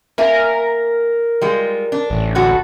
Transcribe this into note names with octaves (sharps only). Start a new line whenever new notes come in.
A#3 A#4 E5 G#5
G3 G#3 F4
D4
A1
D3 F#4 A4